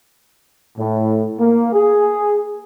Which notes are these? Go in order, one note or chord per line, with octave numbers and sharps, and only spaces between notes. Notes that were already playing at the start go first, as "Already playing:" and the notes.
A2
A#3
G#4